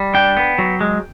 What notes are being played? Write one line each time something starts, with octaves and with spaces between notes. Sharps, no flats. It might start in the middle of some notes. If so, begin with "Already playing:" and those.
Already playing: G3
D4 G5
B3
F#3
G#3